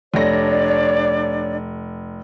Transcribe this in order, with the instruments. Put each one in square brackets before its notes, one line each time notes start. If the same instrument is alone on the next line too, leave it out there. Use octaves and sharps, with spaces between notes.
[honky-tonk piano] F1 A#6 [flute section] D4 C#5 D5